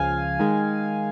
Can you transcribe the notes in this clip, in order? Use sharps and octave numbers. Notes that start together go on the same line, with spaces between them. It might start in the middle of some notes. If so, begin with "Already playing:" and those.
Already playing: C#2 C#3 F3 F5 G#5
D#3 G#3